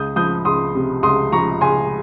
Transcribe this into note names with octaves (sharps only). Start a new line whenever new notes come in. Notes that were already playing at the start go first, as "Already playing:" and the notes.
Already playing: C#2 D#6 G6
F3 D#6 G6
C#2 C6 D#6
C3
C#2 C6 D#6
F3 A#5 C#6
C#2 G#5 C6